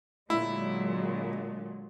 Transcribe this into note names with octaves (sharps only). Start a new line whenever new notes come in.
A#2 D3 F#3 G#3 E4